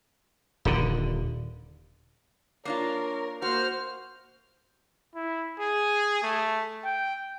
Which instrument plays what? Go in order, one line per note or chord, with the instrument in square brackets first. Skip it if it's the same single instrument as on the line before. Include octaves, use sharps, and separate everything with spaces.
[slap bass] D#1 D3
[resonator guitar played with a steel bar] A#3 D4 F4 [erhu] A#4 [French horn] C#5
[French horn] A#3 [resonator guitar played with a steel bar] F#4 [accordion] C5 [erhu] F6
[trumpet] E4
G#4
A3
G5